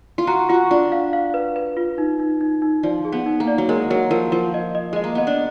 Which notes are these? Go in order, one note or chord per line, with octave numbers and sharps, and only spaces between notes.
F4
F#4 A#5
F4 F#4
D4 F4
F5
F5
B4
B4
F4
D#4
D#4
D#4
D#4
F3 D5
G#4
B3
D#4
A#3
D5
F#3
G#3 A#4
F#3 A#4
F3 A#4
F3 A#4
D#5
D#5
G#3 D#5
A#3
B3 D#5
D4